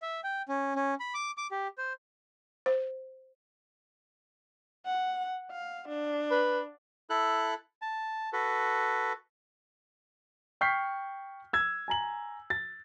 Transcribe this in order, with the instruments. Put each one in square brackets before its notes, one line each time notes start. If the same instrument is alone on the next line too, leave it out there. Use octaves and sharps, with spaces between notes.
[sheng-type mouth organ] E5
G5
C#4
C#4
B5
D6
D6
G4
C5
[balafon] C5
[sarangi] F#5
F5
D4
[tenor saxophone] B4
[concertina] E4 A4 F#6
A5
F#4 A4 B4
[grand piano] G5 C#6 F6 G6 B6 C7
E6 G#6
G#5 A#5 F#7
A6